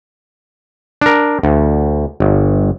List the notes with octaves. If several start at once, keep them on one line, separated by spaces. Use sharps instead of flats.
D4 A#4
D2
G1